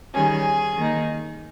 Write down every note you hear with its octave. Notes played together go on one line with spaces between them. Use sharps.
D#3 G3 C#4 G#4
D#3 A#3 D#4